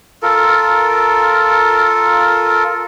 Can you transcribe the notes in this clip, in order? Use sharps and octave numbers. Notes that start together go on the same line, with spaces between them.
F4 A4 A#4